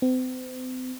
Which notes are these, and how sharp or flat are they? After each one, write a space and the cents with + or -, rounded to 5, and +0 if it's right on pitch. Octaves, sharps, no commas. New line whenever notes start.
C4 -40